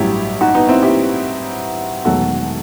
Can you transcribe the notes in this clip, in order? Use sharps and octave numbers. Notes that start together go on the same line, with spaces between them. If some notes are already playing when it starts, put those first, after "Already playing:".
Already playing: A1 G2 F#3 E4 G4
D#4 F#4
B3 D#4
C4 E4
E4 G4
E1 E2 D#3 F#3 A3 F#4 A4